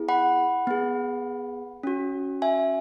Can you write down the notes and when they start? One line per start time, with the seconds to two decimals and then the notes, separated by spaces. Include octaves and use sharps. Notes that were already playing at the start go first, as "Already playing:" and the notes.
Already playing: B3 E4 G#4
0.09 F#5 B5
0.67 B3 G#4
1.83 C#4 F#4
2.42 E5 G#5